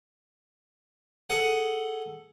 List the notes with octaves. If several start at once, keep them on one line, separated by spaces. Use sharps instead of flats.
G#4 A4 F#5 G#5